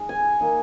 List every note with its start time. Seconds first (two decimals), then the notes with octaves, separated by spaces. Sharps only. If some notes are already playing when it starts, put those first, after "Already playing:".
Already playing: G#3 D#4
0.09 G#5
0.41 A#3 D#4